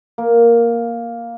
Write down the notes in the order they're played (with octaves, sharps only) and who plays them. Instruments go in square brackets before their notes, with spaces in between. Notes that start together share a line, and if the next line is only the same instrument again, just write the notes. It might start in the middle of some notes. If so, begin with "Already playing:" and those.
[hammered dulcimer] A#3